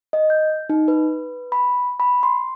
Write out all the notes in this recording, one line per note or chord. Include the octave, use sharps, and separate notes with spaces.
D#5
G6
D#4
B4
B5
B5
C6